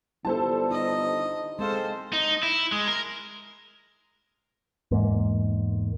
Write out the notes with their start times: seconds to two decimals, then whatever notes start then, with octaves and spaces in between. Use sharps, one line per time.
0.25 G1 G3 E4 A4 C5 A5
0.71 D#4 D#5
1.59 G#3 C4 A4 C5 F5
2.13 D#4
2.43 E4
2.72 G#3
2.88 A#4
4.91 E2 G#2 A#3